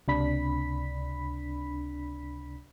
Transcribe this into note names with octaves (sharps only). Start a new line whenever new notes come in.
C#2 C3 D4 B5 B6